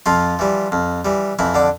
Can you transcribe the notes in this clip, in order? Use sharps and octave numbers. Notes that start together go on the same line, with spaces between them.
F2 F3 F4
E3 G3
F2
E3 G3
F2 E3 E4
D3 D4